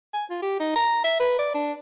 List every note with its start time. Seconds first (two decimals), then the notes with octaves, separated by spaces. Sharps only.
0.13 G#5
0.30 F4
0.42 G4
0.60 D#4
0.76 A#5
1.04 E5
1.20 B4
1.39 D5
1.54 D4